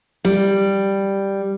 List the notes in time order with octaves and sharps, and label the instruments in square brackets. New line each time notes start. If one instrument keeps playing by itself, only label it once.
[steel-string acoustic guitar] G3